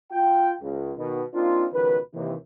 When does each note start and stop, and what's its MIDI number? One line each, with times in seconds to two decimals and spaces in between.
0.11 0.52 65
0.11 0.52 79
0.61 0.91 37
0.97 1.22 47
0.97 1.22 51
1.34 1.65 58
1.34 1.65 60
1.34 1.65 62
1.34 1.65 63
1.34 1.65 65
1.72 1.97 37
1.72 1.97 47
1.72 1.97 51
1.72 1.97 53
1.72 1.97 71
2.14 2.34 39
2.14 2.34 48
2.14 2.34 52